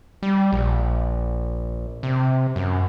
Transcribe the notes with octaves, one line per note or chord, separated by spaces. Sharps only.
G3
A#1
C3
F#2